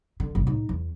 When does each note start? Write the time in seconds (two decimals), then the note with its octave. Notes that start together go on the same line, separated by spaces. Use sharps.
0.20 D3
0.35 G1 C2
0.47 A2 D#4
0.69 E2